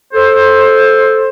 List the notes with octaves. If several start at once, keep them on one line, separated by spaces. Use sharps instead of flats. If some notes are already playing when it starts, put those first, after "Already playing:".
A4 C5